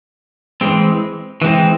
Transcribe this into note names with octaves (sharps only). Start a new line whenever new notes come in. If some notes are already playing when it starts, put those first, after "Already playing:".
E3 G#3 C4
E3 G#3 C4